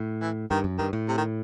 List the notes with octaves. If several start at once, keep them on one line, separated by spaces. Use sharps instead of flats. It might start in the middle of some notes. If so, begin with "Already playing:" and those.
Already playing: A2
E3
G2 D#3
F#2
G2 D#3
A2
C3
D#3